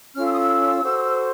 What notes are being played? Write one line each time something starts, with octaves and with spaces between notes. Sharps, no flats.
C#4 F4 A4 F6
E6
D#6
E6
F#4 A4 C5